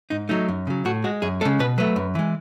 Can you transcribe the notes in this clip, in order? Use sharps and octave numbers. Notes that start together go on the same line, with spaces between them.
G#2 D#4
F#3 A3 D#4
F#2
C#3 F#3
A2 F#4
G#3 F#4
F#2 G#4
C#3 G#3 A4
B2 B4
F#3 A3 B4
F#2
E3 G#3